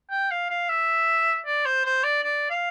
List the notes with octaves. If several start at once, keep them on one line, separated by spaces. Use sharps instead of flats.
G5
F5
F5
E5
D5
C5
C5
D5
D5
F5